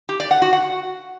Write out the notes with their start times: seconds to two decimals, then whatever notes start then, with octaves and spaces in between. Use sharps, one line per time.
0.09 G4
0.20 D5
0.31 F#5
0.42 F#4
0.53 F#5